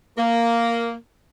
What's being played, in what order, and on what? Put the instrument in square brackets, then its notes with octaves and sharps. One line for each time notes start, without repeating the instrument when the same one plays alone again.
[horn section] A#3